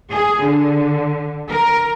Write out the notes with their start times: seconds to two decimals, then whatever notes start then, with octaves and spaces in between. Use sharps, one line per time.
0.11 G#4
0.43 D3
1.50 A#4